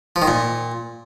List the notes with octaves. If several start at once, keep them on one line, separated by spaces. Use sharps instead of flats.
F3
D#3
A#2